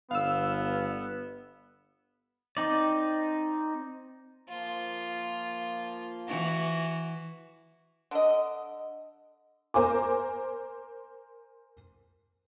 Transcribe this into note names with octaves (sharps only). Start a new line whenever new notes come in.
G1 B3 F5 E6
C4 D#4 D5
F3 A#3 F4
E3 F#4
D3 D#5
A#4 C5 G#5 D6